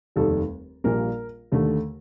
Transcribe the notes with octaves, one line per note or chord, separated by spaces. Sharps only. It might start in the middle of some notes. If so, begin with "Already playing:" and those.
F1 D#2 D#3 G3 A4
A#1 A#2 G3 A#3 A#4
D#2 D3 A3